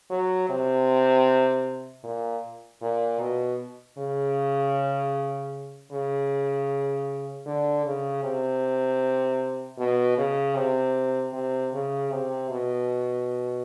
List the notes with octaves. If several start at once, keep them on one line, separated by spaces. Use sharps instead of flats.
F#3
C3
A#2
A#2
B2
C#3
C#3
D3
C#3
C3
B2
C#3
C3
C3
C#3
C3
B2